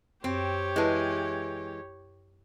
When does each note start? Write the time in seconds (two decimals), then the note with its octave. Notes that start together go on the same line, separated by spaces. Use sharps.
0.24 F#2 C4 G4 C#5
0.76 E3 G#3 E4 B4 A5